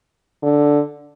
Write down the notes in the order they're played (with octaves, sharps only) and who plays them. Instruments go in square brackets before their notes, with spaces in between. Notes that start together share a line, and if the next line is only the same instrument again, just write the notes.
[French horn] D3